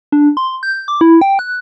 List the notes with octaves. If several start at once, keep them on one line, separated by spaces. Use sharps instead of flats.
D4
C6
G6
D6
E4
G5
F#6